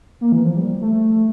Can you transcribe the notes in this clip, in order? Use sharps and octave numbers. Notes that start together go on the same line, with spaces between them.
A#3
E3
F3
G3
A3